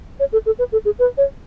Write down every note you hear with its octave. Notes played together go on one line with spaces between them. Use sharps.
C#5
A4
A4
B4
A4
G#4
B4
C#5